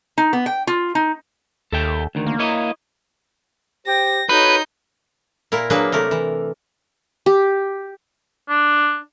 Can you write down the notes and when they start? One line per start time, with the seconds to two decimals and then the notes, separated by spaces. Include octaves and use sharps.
0.18 D#4
0.33 B3
0.46 G5
0.67 F4
0.95 D#4
1.72 D#2 A4 E5 G5
2.15 D2 D#3
2.27 A#3
2.39 E4 C#5 D#5
3.87 G4 C5 G5 A#6
4.29 D#4 F#4 A4 B4 C#5 G6
5.52 A#2 E4 A#4
5.70 F#3 A#3 D4 G#4 B4
5.92 C3 A3 A#4
6.11 E3
7.26 G4
8.49 D4